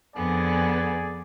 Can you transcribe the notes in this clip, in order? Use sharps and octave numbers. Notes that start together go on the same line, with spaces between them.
F2 D3 B3 G#4 D5 G#5